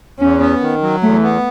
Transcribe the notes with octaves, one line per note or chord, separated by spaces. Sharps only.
E2 C#4
B3
D#3
F#3
E2 A3
B3